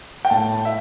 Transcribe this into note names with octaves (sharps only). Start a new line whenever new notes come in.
G5
A2 A5
E5